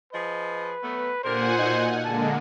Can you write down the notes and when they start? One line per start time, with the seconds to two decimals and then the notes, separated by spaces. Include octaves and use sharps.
0.13 F3 G#4 B4 D#5
0.81 F#3 A3 B3
1.24 A#2 D3 G4 A#4 C5 F#5 G#5
1.58 B2 D#4
2.04 D3 G#3 A#3 A5